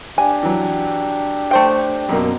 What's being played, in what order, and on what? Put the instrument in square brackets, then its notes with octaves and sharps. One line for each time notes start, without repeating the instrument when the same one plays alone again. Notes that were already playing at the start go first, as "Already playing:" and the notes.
[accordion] D4 G4 [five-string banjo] G#5
[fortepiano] E3 F#3
[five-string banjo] A3 C5 G5
[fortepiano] F#2 B2 A#3